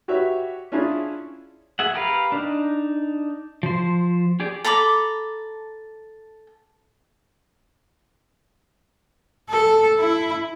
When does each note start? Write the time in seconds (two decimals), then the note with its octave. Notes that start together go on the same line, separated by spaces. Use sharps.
0.08 F#4 G4 B4 C#5 E5
0.72 C#4 D4 E4 F4 G#4
1.79 G#4 E5 F#5
1.94 G4 A#4 B4 F5
2.32 D4 D#4
3.63 F3 C5
4.40 G4 G#4 D5
4.64 A4 A#5 B5 D6
9.50 A4
9.99 E4